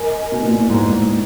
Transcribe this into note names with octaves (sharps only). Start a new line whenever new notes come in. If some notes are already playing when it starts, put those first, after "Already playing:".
Already playing: A#4 D#5 G#5
B2
A#2
A2
G#2
G#2
A2